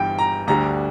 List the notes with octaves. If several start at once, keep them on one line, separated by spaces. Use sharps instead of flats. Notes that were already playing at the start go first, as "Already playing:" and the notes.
Already playing: G1 G2 E3 G5
A#5
D2 D3 G3 A#5